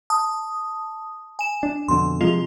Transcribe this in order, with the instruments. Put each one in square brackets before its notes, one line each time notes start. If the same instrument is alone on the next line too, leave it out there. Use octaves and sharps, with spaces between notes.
[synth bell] A5 D#6
G#5 E7
[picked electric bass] D4
[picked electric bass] F2 B2 D3 [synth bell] C6
[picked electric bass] C3 F3 G#3 [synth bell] F4